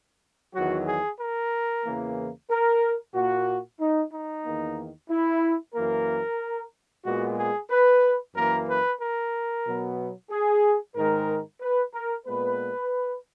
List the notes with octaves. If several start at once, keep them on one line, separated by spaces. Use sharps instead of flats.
E2 D#3 F#3 F#4
G#4
A#4
E2 C#3 E3 A#3
A#4
A#2 A#3 F#4
D#4
D#4
E2 D#3 A#3
E4
F#2 E3 A#3 A#4
A#2 G#3 B3 F#4
G#4
B4
F#2 E3 A#3 A#4
B4
A#4
B2 F#3 B3
G#4
G#2 D#3 G#3 A#4
B4
A#4
A#2 G#3 B3 B4